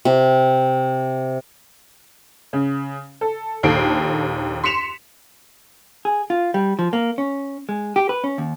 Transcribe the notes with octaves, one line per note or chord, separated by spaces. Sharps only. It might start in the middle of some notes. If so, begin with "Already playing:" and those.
C3
C#3
A4
A#1 D#2 A4 G5 C7 D7
C6 B6 C#7 E7 F7
G#4
F4
G3
F3
A#3
C#4
G#3
G4
B4
C#4
D#2